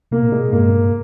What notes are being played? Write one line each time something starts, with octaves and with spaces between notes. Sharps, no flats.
C3 A#3
A#2
C3 G#3
A#2
G2 A#3